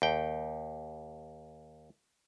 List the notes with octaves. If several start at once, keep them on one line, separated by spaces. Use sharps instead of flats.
D#2 G5